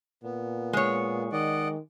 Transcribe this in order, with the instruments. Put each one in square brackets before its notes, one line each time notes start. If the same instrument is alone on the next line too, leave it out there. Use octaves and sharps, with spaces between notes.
[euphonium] A#2 [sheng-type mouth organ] B3
[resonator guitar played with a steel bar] G#3 C#5
[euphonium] D#3 [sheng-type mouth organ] D5 D#5 F#5